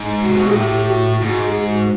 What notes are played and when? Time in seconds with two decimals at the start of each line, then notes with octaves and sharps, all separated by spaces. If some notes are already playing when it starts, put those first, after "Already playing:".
Already playing: G#2
0.22 C3 F#4
0.35 B2
0.45 A#2 G#4
0.54 A2 G4
0.79 G4
0.89 F#4
1.22 G#2 F#4
1.45 G#4
1.68 F#4